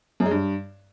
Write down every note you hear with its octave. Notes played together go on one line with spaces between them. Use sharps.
F#2
G#3
G2